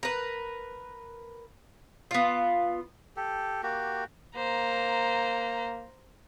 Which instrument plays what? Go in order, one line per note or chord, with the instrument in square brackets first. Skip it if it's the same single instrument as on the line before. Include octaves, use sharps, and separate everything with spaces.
[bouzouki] A#4 B4
B3 F4
[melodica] G4 A4
A#3 F#4 G4
[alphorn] A#3 [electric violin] C5 A#5